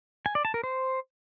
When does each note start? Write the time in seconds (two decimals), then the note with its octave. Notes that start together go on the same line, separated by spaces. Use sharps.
0.26 G#5
0.35 D5
0.45 A5
0.54 A#4
0.64 C5